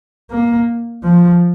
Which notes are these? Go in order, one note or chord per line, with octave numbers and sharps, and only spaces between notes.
A#3
F3